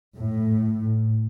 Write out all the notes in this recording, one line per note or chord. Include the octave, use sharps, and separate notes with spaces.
A2